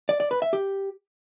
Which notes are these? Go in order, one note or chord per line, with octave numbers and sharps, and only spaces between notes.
D5
D5
B4
E5
G4